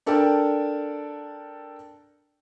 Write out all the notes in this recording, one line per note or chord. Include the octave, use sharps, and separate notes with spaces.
D4 A4 A#4 D5 G5 A5